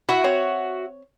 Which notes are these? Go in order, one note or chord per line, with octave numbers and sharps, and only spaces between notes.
E4 F#4 E5
C4 C#5